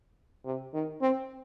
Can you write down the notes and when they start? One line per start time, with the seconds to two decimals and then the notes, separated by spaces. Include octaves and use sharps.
0.45 C3
0.74 D#3
1.01 C4